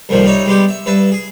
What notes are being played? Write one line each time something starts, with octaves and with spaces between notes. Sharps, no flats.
C2 F2 A#2 D#3 F3
G3 D#4 C#5 E5
G3 G#3 B3 G4
E5
G2 B4 E5 A5
G#4